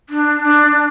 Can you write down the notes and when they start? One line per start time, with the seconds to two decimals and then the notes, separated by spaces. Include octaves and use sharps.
0.09 D4
0.43 D4